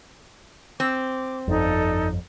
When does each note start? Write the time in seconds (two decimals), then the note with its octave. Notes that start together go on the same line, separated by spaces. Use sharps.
0.80 C4 D6
1.48 G1 F2 D#4 A4 D5